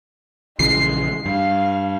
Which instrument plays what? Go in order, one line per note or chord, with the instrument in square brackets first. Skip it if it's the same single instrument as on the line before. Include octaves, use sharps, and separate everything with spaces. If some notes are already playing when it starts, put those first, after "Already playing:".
[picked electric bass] A#1 C#3 E3 [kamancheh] G#3 [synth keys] C7
[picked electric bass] G2 [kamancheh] F5